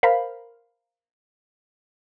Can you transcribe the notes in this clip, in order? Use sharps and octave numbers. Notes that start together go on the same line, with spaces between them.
A#4 C5 F5 B5